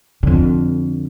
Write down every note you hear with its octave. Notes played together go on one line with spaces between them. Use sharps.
F2 D3